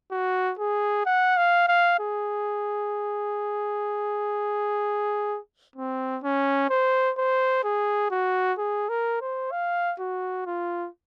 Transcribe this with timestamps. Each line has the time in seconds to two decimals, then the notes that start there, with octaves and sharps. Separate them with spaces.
0.11 F#4
0.59 G#4
1.06 F#5
1.37 F5
1.68 F5
2.00 G#4
5.76 C4
6.24 C#4
6.70 C5
7.18 C5
7.64 G#4
8.11 F#4
8.58 G#4
8.89 A#4
9.21 C5
9.52 F5
9.99 F#4
10.46 F4